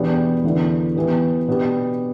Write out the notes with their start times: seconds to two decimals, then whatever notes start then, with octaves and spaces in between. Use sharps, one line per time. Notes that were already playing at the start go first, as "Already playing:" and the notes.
Already playing: E2 B2 B3 D4 G4
0.44 E2 D3 B3 E4
0.96 E3 B3 G4 B4
1.48 B2 B3 D4 G4